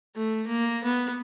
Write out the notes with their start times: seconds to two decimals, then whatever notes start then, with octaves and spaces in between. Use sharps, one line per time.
0.15 A3
0.47 A#3
0.84 B3